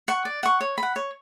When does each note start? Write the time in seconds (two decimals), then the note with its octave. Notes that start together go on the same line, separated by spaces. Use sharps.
0.08 F#5 C#6
0.25 D5
0.43 F#5 C#6
0.61 C#5
0.78 B5
0.83 F#5
0.96 C#5